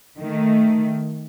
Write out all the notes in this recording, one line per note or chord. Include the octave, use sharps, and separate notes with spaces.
D#3 A3